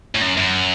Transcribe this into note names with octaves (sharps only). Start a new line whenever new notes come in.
A2
F#2
F#2